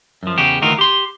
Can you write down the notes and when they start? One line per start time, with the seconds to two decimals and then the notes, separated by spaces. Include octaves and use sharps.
0.23 F#2 F3
0.38 E2 C#3 F#4 G4
0.62 D2 D#3 E3 F4 F#4 A#4
0.79 G4 C6